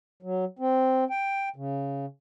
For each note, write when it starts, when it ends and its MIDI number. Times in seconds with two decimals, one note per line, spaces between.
0.23 0.45 54
0.59 1.04 60
1.10 1.49 79
1.56 2.06 49